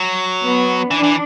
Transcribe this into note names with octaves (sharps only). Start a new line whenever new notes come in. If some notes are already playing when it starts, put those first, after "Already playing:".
Already playing: F#3
B3
E3 D4
E3